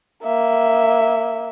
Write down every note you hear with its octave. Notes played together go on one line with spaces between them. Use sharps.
A#3 E5